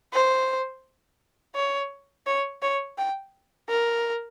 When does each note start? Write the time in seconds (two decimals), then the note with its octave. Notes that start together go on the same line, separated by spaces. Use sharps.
0.13 C5
1.56 C#5
2.27 C#5
2.62 C#5
2.98 G5
3.69 A#4